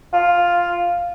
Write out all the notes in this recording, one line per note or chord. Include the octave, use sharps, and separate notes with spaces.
F4